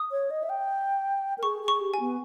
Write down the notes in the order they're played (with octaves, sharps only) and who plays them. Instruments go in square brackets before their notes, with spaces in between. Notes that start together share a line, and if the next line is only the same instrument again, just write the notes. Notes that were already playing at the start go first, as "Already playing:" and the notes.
Already playing: [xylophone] D#6
[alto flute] C#5
D#5
E5
G5
A#4
[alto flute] G#4 [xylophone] C#6
[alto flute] G#4
[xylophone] C#6
[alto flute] G4
[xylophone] G#5
[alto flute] B3